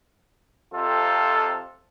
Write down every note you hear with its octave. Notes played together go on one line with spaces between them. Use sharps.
F2 C3 F4 A4